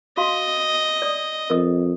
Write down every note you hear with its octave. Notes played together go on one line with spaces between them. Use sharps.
F#4 D#5 F5 C6
D5 D#6
F2 A#4 D#5 D#6